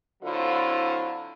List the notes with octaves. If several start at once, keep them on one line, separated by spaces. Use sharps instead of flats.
D3 F#3 C4 E4 F4